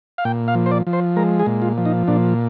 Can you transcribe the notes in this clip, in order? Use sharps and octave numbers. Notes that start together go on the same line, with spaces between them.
F5
A#2 G5
F5
F3
C5
D5
F3
C5
G#3 A#4
G#4
A#2
F4
F3
D#4
A#2 D4